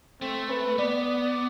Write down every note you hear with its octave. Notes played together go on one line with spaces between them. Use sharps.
A3 C4
B4
B3 D5